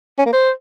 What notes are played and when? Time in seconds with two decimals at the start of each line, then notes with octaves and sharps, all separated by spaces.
0.19 C#4
0.26 A#3
0.33 C5